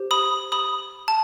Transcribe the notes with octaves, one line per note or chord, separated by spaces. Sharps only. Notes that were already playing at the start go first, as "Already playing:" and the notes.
Already playing: G4 C5
B5 D#6
B5 D#6
A5